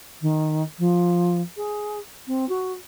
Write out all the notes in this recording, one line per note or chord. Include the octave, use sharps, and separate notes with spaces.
D#3
F3
G#4
C4
F#4